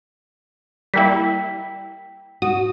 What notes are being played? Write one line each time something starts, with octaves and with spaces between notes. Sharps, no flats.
G3 A#3 E4 G5 B6
F#4 D#6